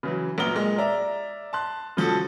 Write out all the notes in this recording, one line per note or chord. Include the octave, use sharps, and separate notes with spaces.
C#3 E3 F#3
A#1 F#3 B3 A#5 F6 G7
A#2 G#3
D5 E5 A#5
A5 C6 F#6
C#3 F3 F#4 A4